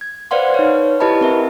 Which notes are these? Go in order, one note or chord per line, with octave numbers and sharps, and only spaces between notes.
G#6
B4 C5 D5 F5 F#5 C6
D#4 B4 C#5
E4 G4 B4 D#5 A5 B5
C4 A#4 E5